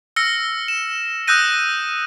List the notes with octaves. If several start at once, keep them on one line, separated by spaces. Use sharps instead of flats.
E6 F6 A#6 C#7
E7
D#6 E6 F#6 G6 A#6 D#7